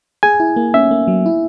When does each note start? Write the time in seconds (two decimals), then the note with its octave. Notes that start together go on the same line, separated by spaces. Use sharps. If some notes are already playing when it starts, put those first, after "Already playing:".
0.23 G#4 G#5
0.40 E4
0.56 A#3
0.74 C#4 E5
0.91 A#3
1.08 F#3
1.26 E4